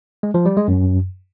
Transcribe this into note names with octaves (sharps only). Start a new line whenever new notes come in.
G#3
F3
G3
G#3
F#2